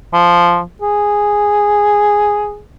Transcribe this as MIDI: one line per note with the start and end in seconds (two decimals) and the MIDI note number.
0.14 0.62 53
0.82 2.60 68